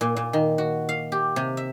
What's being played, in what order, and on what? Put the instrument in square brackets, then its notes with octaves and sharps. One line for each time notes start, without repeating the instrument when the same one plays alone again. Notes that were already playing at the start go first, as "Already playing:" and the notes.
[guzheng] A#2
A#2
D#3
F#4
F5
G4
C3
E5